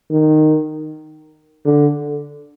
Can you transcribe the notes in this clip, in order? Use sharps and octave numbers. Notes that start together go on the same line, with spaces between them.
D#3
D3